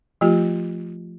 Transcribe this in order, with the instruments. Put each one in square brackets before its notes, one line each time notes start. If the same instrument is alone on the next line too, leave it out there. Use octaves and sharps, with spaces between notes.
[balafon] F3 A3 F4 G4